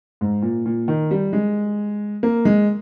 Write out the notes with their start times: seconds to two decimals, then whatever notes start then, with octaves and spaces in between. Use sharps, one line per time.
0.21 G#2
0.42 A#2
0.66 A#2
0.88 D#3
1.11 G3
1.33 G#3
2.23 A#3
2.45 G#3